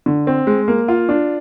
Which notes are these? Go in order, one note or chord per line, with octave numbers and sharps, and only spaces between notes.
D3
C4
G#3
A#3
F4
D4